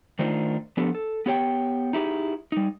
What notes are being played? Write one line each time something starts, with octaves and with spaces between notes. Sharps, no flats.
D#3 A3 D4 D#4 F4 C5
F3 B3 D4 G4 A4
A4
B3 G4 C#5 G5
D#4 E4 G4 G#4
G3 D#4